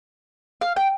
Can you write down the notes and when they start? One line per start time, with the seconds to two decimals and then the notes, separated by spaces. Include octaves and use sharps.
0.61 F5
0.76 G5